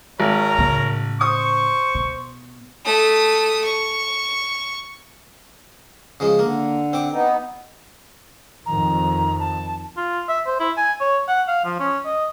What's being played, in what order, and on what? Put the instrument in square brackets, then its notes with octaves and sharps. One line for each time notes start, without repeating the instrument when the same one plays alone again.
[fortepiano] G#1 [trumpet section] A#4 C#5 A#5
[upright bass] A2 C#3
[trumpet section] C5 C#6 [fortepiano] D#6
[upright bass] B2
[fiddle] A3 D#6
C#6
[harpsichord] C#3 F3 G#3
[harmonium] D3 [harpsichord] A#3
[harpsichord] C4 D6
[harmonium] B3 D#4
[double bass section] F2 D#3 [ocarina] A#5
[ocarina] A5
[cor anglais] F4
E5
C5
E4
G#5
C#5
F#5
F5
F3
C#4
D#5